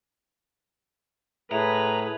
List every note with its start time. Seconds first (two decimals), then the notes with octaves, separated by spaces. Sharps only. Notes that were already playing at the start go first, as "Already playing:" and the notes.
1.51 A2 G#4 B4 E5 A5 A#5